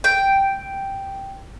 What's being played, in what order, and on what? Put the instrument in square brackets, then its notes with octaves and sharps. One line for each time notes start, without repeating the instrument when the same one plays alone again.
[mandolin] G5